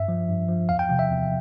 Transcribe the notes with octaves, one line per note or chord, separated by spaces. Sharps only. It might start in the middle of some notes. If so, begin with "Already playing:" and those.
Already playing: G2 E5
F3
G2
F3
E2 F5
G5
C3 F3
E5
E2